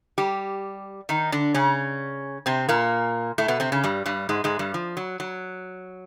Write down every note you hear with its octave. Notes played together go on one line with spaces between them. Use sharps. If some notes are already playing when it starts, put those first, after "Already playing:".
G3 G4
D#3 D#4
D3 D4
C#3 C#4
C3 C4
A#2 A#3
A2 A3
B2 B3
C3 C4
C#3 C#4
G2 G3
G2 G3
G#2 G#3
G#2 G#3
G2 G3
F3
F#3
F#3